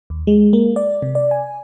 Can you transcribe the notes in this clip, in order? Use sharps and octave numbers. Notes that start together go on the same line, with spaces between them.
D#2
G#3
A#3
D5
C3
D5
G#5